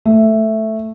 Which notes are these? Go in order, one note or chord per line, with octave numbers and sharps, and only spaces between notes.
A3